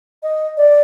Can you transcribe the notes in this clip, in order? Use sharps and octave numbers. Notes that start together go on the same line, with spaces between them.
D#5
D5